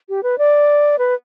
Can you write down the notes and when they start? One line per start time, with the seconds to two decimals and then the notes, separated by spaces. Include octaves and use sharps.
0.09 G4
0.23 B4
0.38 D5
0.99 B4